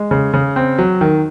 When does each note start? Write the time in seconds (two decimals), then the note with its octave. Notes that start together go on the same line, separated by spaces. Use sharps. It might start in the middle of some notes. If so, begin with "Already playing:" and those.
Already playing: G#3
0.11 C#3
0.34 C#3
0.56 C4
0.79 F#3
1.01 D#3